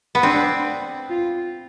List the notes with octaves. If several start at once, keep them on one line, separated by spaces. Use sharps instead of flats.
B3
C4 D4
F4